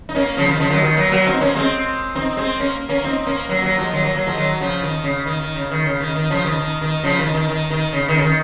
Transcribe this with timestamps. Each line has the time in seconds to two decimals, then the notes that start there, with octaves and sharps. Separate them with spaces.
0.09 D#4
0.15 A#3 C#4
0.37 C#3 F3
0.49 D#3
0.60 C#3 F3
0.70 D#3 F#3
0.82 D#3
0.96 F#3 A#3
1.11 F#3 A#3
1.26 C4 D#4
1.41 A#3 C#4
1.55 G#3 C4
2.15 C4 D#4
2.37 G#3 C4
2.59 A#3 C#4
2.89 A#3 C#4
3.04 C4 D#4
3.26 A#3 C#4
3.49 F#3 A#3
3.63 F#3 A#3
3.78 F3 G#3
3.93 D#3 F#3
4.04 F#3 A#3
4.15 F#3 A#3
4.26 F3 G#3
4.37 D#3 F#3
4.60 C#3 F3
4.82 D#3
5.04 C#3
5.26 D#3
5.41 D#3
5.55 C#3
5.71 D#3
5.85 C#3
6.00 D#3
6.15 D#3
6.30 C#3 F3
6.45 D#3
6.59 D#3
6.81 D#3
7.03 C#3 F3
7.19 D#3
7.34 D#3
7.48 D#3
7.70 D#3
7.93 C#3
8.08 D#3
8.17 C#3
8.22 D#3